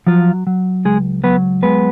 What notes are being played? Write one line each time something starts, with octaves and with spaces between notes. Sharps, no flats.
F3 F#3 F4
F#3
C#2 G#3 G#4
F#3 B3 B4
G#3 B3 B4